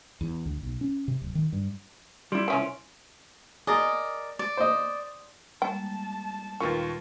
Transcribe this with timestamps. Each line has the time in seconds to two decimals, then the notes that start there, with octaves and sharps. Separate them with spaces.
0.21 E2
0.46 D2
0.63 B1
0.81 C#4
1.08 C3
1.21 D1
1.35 D#3
1.52 G2
2.32 G3 E4 C6 D7
2.48 C2 E3 C#4 F4 E5
3.67 G#4 A#4 D5 D#5
4.39 D5
4.57 C5 D#5
5.62 G3 G#3 A#3 G5 A5
6.60 D#2 A#2 D#3 F4 B4 G5 C#6